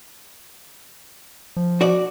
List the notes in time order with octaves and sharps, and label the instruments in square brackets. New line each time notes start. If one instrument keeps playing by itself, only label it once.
[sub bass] F3
[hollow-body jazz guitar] F#4 D5